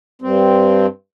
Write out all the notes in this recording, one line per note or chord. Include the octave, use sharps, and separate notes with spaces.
G2 C4